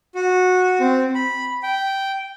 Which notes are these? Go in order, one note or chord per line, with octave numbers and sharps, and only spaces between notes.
F#4
C4
B5
G5